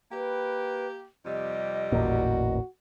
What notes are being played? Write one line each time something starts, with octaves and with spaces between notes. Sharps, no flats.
A#3 G4 B4
F2 C3 G3 D#5
A1 E2 A#2 F#4